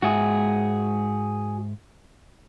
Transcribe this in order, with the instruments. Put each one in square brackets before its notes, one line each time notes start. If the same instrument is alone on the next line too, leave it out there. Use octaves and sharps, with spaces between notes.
[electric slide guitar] G#2 G#3 E5 [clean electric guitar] F#4 G#4